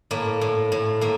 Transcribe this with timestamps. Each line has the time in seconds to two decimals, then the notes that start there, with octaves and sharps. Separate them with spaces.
0.11 A2 A#3
0.41 A2
0.72 A2
1.01 A2 A#3